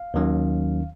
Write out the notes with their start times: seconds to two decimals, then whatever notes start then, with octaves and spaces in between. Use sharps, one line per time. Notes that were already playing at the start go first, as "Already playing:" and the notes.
Already playing: F5
0.14 D#2 D#3 F#3 C#4